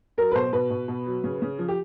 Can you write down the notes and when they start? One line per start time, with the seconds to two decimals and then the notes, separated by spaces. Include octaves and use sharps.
0.18 F#3 A#4
0.32 B4
0.35 B2 C5
0.53 B2 B4
0.70 B2
0.88 B2
1.06 F#3
1.24 C#3
1.42 C#3
1.59 F3
1.68 G4